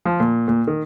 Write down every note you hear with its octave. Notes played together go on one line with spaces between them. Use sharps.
F3
A#2
A#2
D#3